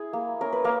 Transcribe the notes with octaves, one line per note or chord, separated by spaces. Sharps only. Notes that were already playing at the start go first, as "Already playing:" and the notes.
Already playing: E4 G#4
A#3
C#4 A#4
B4
A#3 A#4